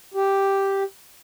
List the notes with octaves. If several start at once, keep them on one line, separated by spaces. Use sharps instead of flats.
G4